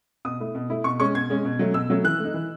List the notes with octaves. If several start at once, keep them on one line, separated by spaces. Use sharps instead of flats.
B2 D#6
A3 E4
B2
A3 E4
B2 C#6
G#3 C#4 C#6
B2 G#6
G#3 C#4
B2
F#3 A3 C#4
B2 E6
F#3 A3 C#4
E3 F#6
A3 D#4
E3